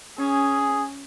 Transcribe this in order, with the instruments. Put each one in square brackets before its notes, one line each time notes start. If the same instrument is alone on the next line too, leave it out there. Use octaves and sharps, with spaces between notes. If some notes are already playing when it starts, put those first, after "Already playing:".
[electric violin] C#4 [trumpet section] G#4